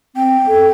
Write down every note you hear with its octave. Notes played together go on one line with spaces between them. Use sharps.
C4 G5
A4